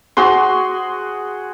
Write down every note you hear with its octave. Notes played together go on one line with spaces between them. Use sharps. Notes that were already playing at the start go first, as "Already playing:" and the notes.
F#4 G#4 C6